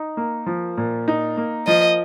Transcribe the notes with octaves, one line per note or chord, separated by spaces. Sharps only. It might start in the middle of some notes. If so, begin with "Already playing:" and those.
Already playing: D#4
A#3
F3
A#2
D#4
A#3
F3 D#5